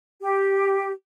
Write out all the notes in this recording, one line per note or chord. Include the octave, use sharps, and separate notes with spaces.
G4